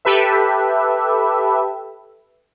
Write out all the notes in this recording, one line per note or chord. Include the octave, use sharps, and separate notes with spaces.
G4 A4 B4 E5